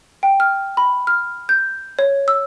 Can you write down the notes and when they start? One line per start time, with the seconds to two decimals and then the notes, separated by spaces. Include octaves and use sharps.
0.23 G5
0.40 F6
0.77 B5
1.07 F6
1.49 G6
1.99 C#5
2.28 E6